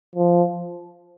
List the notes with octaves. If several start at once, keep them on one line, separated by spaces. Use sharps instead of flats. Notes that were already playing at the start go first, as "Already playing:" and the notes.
F3